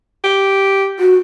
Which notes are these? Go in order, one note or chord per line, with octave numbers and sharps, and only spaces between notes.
G4
F#4